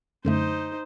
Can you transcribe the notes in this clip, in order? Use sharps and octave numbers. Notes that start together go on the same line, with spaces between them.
F#2 D3 A3 D#4 C5